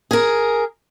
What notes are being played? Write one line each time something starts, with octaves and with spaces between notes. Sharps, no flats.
G#4 A#4